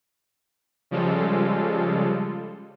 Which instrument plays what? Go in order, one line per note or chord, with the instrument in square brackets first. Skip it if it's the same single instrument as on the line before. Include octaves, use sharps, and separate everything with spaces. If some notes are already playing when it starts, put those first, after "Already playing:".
[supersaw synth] C#3 F3 G3 G#3 F4 A4